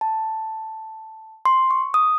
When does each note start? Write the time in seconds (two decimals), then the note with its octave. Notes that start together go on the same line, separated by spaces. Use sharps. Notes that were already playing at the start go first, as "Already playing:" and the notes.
0.01 A5
1.45 C6
1.71 C#6
1.94 D#6